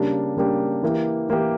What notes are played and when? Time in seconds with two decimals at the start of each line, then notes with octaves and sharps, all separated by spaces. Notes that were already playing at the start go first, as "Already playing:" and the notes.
Already playing: C#3 G3 A#3 D4 G4
0.37 C#3 G3 A#3 D4 G4
0.83 E3 A#3 E4 G4
1.29 E3 A#3 E4 G4